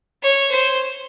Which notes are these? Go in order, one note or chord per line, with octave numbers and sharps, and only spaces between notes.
C#5
C5